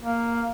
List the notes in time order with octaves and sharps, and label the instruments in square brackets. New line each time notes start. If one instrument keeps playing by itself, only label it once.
[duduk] A#3